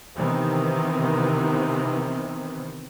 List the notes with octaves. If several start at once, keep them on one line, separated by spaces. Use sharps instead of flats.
C3 D#3 E3 B3 C4